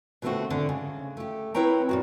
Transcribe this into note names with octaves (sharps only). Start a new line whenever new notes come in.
B2 D3 A3 B3 C4 F#4
G#2 D3 D4
C#3
A3 G4
C4 E4 B4 C#5 G5 A#5
A#2 G#3 F#4